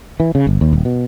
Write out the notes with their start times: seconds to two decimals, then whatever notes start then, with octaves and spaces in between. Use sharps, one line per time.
0.20 E3
0.35 C#3
0.47 G1
0.61 D#2
0.73 D#1
0.85 B2